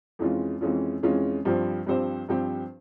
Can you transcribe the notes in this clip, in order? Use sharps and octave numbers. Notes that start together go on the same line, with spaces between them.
F2 E3 G#3 C#4 F4
F2 E3 G#3 C#4 F4
F2 E3 G#3 C#4 F4
G2 F3 C4 G4 C5
G2 F3 C4 G4 C5
G2 F3 C4 G4 C5